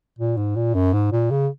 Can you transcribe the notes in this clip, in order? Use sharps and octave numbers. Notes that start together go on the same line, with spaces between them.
A#2
G#2
A#2
F#2
G#2
A#2
C#3